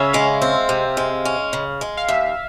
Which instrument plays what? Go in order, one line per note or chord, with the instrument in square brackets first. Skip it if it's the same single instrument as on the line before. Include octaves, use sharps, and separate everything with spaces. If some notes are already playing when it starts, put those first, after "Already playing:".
Already playing: [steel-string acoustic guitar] C#3 C#4 [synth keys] E5 F5
[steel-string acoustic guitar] G#3 [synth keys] F5
[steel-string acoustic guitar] C4
C3
G#3
C#4
C#3
G#3
[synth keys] F5
[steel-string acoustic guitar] D#2 [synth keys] E5